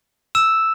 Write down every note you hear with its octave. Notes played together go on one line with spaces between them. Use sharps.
E6 E7